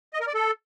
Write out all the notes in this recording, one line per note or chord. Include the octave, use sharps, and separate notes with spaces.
D#5
A#4
D5
A4